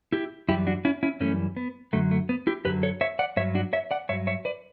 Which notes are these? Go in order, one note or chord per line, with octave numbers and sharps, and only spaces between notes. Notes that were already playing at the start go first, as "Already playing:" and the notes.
E4 G4
F#2 E3 G3 E4 G4
D4 F#4
C#4 E4
C#4 E4
F#2 E3 G3 A3 C#4
B3
F#2 D3 F#3 A3
A3
B3
E4 G4
F#2 D3 F#3 G4 B4
A4 C#5
C#5 E5
D5 F#5
G2 F#3 C#5 E5
D4 F#4
C#5 E5
D5 F#5
G2 F#3 C#5 E5
C#5 E5
B4 D5